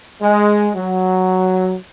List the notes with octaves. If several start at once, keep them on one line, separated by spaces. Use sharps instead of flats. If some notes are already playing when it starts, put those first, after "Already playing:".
G#3
F#3